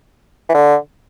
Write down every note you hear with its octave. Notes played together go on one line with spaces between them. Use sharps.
E3
D3